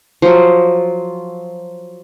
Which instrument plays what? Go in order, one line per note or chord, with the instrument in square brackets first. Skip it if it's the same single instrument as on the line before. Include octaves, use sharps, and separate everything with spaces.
[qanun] F3 F#3